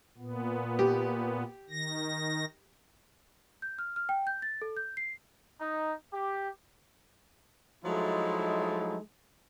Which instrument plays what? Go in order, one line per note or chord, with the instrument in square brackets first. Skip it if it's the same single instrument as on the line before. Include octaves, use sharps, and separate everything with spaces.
[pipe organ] A#2 B3
[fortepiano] G4
[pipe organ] D#3 A#6
[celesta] G6
F6
F6
G5
G6
A6
A4
G6
C7
[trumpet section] D#4
G4
[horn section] F3 F#3 G#3 A3 D#4 E4